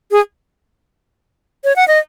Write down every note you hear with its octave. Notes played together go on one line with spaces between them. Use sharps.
G#4
C#5
F#5
D#5